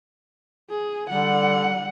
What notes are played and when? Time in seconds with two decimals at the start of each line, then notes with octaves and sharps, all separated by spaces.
0.70 G#4
1.10 D3 G3 F#5